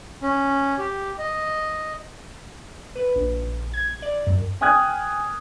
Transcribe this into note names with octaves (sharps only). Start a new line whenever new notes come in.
C#4
G4
D#5
B4
A#1
G#6
D5
F#2
G5 G#5 D#6 F6 F#6 G#6